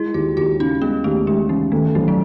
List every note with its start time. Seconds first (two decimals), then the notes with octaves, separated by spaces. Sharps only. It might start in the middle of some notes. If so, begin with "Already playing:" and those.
Already playing: G#3 E4
0.14 D#2 F#4
0.37 D#2 F#4
0.60 C#3 D#4
0.82 G#3 B3
1.04 D#2 A3
1.27 D#2 G#3
1.49 C#3 E3
1.72 D#3 A3
1.95 B1 E3
2.08 F#3